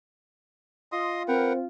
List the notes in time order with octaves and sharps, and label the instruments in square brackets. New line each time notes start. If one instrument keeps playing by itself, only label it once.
[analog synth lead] F4 [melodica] D#5 C6 D#6
[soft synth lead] C4 [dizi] A#4 [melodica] B4 F#5 G5